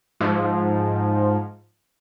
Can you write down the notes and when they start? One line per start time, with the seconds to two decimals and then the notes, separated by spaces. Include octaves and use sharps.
0.20 G#2 F3